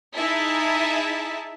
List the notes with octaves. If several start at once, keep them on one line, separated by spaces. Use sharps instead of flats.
D#4 E4 G#4 E5 A5